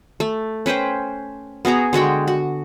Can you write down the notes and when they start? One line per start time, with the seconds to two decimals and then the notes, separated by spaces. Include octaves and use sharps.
0.20 A3
0.66 C#4 B4 C5 G5
1.65 B3 F#4 G#4 A#5
1.93 D3 G#3 F#4 G5
2.28 F#4